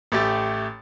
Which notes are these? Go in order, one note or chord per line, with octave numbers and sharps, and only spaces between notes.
A1 A3 G4 A6